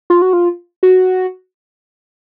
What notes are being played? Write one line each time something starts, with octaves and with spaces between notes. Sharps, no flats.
F4
F#4
F4
F#4